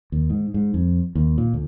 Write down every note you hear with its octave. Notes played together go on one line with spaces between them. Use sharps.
D#2
G#2
G#2
F2
D#2
A#2
D2